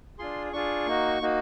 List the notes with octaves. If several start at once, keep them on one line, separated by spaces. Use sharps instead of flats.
D4 F4 G#4 C6
D4 F4 G#4 C#6
A#3 D#4 F#4
A#3 D#4 F#4